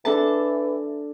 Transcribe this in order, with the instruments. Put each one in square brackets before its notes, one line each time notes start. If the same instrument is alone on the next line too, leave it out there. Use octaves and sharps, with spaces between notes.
[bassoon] E3 [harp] D4 A4 A5